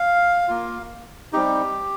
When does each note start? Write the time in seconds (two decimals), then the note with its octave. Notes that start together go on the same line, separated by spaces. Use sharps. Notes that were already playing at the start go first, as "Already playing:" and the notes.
Already playing: F5
0.48 A#3 F4
1.33 G3 C4 D#4 G4